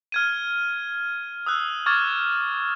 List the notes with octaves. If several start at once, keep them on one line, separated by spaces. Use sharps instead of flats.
F6 G#6 D#7
D#6 E6 F#6
C#6 D6 F6 G#6 A6